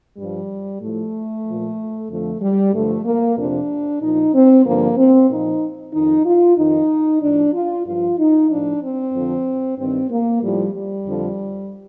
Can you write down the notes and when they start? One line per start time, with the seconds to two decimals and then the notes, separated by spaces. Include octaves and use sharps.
0.18 G2 F3 G3
0.81 A2 F3 A3
1.46 A#2 F3
2.09 F2 D3 F3 A3
2.41 G3
2.73 G2 D3 F3 A3
3.05 A#3
3.37 F2 C3 F3 D4
4.02 A#2 F3 D#4
4.34 C4
4.65 G2 D3 F3 A#3
4.98 C4
5.30 A#2 F3 D#4
5.94 F2 D#3 D#4
6.26 F4
6.57 F2 D#3 D#4
7.22 A2 F3 D4
7.54 F4
7.86 G2 F3 F4
8.18 D#4
8.50 A2 F3 D4
8.82 C4
9.13 F2 D3 F3
9.78 G2 D#3 C4
10.11 A#3
10.42 A2 F3 G3
10.74 G3
11.06 F2 D3 F3